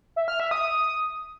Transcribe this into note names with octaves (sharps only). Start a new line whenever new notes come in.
E5
F6
E5
D#6